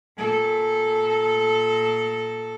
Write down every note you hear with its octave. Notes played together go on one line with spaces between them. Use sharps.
A#2 A4